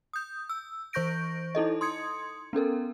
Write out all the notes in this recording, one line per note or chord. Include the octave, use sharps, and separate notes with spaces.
D#6 G6
E6
E3 C5 C#6 G6 A#6 D7
D#4 E4 A4 D#5
C6 D#6 G#6 C#7
B3 C#4 A4 A#4